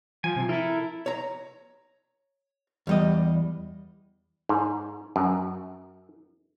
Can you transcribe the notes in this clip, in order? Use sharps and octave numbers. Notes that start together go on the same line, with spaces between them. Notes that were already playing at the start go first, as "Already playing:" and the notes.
F3 G#5
C3 F3
E4 A4 A#4
C#5 A#5
E2 G3 D#5
G#2
F#2